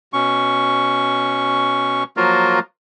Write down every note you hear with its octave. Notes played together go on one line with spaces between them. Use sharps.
B2 C#4 C#6
F3 F#3 A#3 F4 F#4 A#4